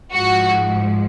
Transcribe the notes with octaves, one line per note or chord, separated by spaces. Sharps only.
G#2 F3 G#3 F#4